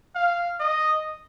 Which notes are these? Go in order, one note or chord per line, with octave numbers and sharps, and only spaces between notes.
F5
D#5